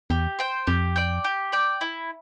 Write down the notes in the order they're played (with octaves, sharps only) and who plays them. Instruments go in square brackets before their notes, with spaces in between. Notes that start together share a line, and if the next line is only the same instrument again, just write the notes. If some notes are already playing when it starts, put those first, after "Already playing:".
[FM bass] E2 [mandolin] G4
[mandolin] C5 G5
[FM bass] F2 [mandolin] G4
[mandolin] D5 G5
G4
D5 G5
E4